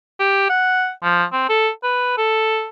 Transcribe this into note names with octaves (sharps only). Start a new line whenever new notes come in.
G4
F#5
F3
C4
A4
B4
A4